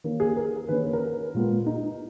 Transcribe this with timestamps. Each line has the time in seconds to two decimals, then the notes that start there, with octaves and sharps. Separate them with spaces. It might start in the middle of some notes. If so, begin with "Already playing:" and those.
0.04 D#3 A#3 C#4
0.20 G#4
0.36 A#4
0.68 D#3 A#3 C#4 B4
0.85 B4
0.93 A#4
1.34 A#2 G#3 B3
1.66 D#4